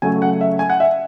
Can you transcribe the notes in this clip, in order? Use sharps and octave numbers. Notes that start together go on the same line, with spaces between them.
C#3 F#3 A3 G#5
F#5
E5
G#5
F#5
E5